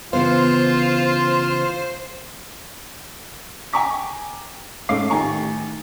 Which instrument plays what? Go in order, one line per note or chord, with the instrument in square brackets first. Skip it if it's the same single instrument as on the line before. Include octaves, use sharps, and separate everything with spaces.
[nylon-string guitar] C#3 E3 B3 [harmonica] F4 [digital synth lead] C5
[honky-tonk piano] G5 G#5 A#5 C#6 D6 B6
G#2 A3 C#4 F5 D6 C7
A1 D#3 G4 G#5 A#5 C#6